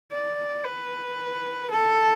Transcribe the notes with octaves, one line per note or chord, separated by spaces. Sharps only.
D5
B4
A4